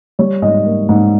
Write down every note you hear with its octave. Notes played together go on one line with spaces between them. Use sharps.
G3 C#5
G#2 D#5
A#3
G#2